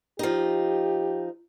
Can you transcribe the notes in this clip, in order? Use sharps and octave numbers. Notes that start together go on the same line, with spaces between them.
F3 D#4 G4